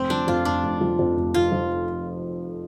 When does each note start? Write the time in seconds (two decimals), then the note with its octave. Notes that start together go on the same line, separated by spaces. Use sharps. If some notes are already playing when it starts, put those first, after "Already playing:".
Already playing: F1 C4
0.10 F3 D4
0.28 F2 F4
0.45 F1 D4
0.63 F1
0.81 F3
0.99 F2
1.17 F1
1.34 F1 F4
1.52 F3